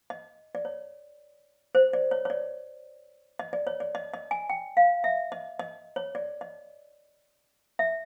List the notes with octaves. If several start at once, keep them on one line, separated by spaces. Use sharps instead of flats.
D#5
D5
C#5
C5
D5
C#5
C#5
D5
D#5
D5
C#5
D5
D#5
D#5
G#5
G5
F5
E5
D#5
D#5
C#5
D5
D#5
E5